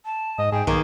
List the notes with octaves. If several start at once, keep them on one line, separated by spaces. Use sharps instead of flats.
A5
G#2 D#5
G#2 G#4 G5
B1 D#3 A#3 G#4